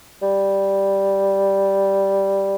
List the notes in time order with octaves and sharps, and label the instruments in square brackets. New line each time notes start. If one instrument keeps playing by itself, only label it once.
[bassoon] G3